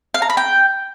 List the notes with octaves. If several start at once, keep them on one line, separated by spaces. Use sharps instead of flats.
F5
A#5
B5
G5